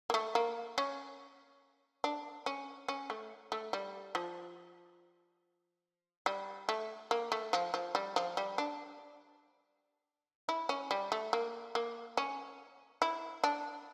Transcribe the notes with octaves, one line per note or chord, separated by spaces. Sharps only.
A#3
A3
A#3
C#4
D4
C#4
C#4
A3
A3
G3
F3
G3
A3
A#3
A3
F3
F3
G3
F3
G3
D4
E4
C#4
G3
A3
A#3
A#3
C#4
E4
D4